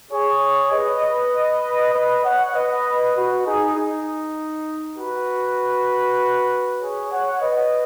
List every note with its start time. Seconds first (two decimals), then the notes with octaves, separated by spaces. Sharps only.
0.11 G#4 C#5
0.72 B4 D#5
1.94 B4 D#5
2.24 C#5 F#5
2.54 B4 D#5
3.15 F#4 B4
3.46 D#4 G#4
3.77 D#4
4.98 F#4 B4
6.81 G#4 C#5
7.11 C#5 F#5
7.41 B4 D#5